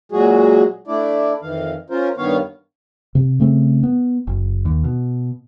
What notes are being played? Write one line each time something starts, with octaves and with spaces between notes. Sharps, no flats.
A#2 F#3 G#3 F#4 G#4
A3 D4 E4 D5
F2 D#3 E3 F5
C#4 F4 A#4 C5
G2 D#3 B3 C#5 F5
C3
C#3 A3 C4
B3
F#1
D#2
B2